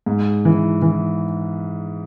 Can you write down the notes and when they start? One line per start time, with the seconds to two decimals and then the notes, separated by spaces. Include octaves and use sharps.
0.06 G#2
0.45 E3
0.82 E3